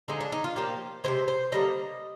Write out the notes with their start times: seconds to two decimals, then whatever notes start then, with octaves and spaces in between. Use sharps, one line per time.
0.08 D3 F3 G#3 D#4
0.20 D4
0.32 D#4
0.44 F4
0.56 A#2 F3 A#3 G4
1.04 C3 D#3 G#3 C5
1.28 C5
1.52 D3 G3 A#3 D#5